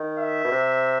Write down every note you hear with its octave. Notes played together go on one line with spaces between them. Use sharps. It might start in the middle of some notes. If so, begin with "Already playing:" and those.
Already playing: D#3
E5
B2
C3